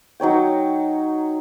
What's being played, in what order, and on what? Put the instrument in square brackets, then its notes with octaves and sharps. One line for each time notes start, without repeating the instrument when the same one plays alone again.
[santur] F#3 D#4 C#5 G5